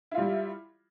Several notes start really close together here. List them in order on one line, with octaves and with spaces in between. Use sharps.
E4 F4 G3